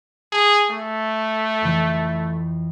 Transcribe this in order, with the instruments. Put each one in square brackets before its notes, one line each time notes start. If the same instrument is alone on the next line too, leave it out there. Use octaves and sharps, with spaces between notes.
[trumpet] G#4 [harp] A5
[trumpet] A3
[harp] F2 E3